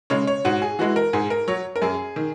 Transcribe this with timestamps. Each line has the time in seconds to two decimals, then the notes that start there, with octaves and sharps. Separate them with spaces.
0.10 C#3 G#3 C#5
0.27 C#5
0.45 G#2 F#4
0.62 G#4
0.79 E3 G#3 F#4
0.96 A#4
1.13 G#2 G#4
1.30 A#4
1.48 F#3 C#5
1.76 A#4
1.82 F#2 G#4
2.16 D#3